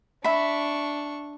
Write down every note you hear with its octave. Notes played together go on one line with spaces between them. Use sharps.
D4 E5 B5 C#6